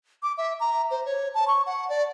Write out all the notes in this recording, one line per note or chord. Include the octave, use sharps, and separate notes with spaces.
D6
E5
A#5
C5
C#5
A5
C#6
F#5
D5